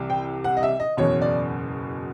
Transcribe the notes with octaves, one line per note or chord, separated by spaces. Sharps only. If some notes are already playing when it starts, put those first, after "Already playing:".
Already playing: C2 C3 E3
G5
F#5
D#5
E5
D#5
F#1 E2 B2 C#5
D5